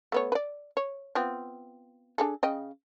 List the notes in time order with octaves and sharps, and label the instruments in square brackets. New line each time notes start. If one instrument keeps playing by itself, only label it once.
[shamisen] A3 B3 C#5
B4 D5
C#5
B3 C4 F4
D4 G#4 A4
C#3 D#5 G5